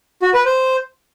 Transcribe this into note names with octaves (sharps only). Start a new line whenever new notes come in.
F#4
B4
C5